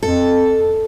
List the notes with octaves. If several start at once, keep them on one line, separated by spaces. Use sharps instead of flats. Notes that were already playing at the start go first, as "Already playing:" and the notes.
F2 A4